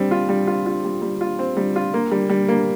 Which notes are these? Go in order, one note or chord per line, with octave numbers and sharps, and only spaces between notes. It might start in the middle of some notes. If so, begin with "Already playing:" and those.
Already playing: G3 C4
F4
G3
F4
F4
G3
G3
F4
C4
G3
F4
A#3
G3
G3
A#3